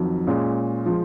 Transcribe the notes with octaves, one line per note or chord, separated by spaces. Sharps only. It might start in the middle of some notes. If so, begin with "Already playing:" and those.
Already playing: F2 D#3 F#3
A#2 G#3 C#4
F3 G#3